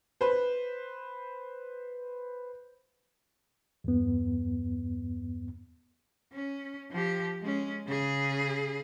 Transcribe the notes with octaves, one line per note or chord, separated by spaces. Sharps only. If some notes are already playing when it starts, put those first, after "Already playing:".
B4 C5
E2 G2 B3
C#4
F3 G4
G#3 C#4
C#3 G#4